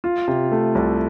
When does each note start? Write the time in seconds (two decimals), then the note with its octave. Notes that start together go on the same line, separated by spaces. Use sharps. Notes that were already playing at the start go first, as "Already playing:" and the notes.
0.04 F4
0.28 C3
0.52 A3
0.75 C2